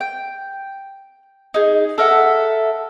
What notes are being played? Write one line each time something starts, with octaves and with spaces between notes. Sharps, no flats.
G5
D#4 G#4
A4 A#4 E5 F#5